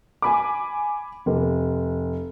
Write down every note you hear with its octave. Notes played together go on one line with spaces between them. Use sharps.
G#5 B5 D6
F1